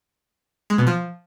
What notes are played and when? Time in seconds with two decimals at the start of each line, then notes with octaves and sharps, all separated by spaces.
0.70 G#3
0.78 B2
0.87 F3